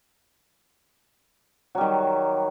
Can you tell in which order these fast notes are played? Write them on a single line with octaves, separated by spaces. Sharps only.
F#3 G3 D#3